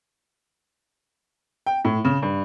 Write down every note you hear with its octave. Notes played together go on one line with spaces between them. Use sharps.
G5
A2
C#3
G2